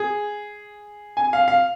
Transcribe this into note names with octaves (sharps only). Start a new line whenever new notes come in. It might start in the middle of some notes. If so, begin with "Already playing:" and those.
Already playing: G#4
G#5
F5
F5